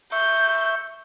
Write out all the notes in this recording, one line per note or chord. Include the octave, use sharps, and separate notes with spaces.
E5 C#6 G6